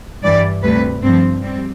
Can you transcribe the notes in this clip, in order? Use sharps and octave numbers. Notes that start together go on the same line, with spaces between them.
G2 E3 G3 D5
D2 C3 G3 B4
G2 F3 C4
G3 C4